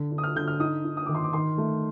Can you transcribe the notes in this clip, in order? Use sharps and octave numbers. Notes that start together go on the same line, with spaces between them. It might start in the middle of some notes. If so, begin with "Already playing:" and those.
Already playing: D3
D3
D#6
F6
D3 G6
F6
D#4 D#6
D#4
D#6
D#3 D6
C6
D6
D#3 C6
A3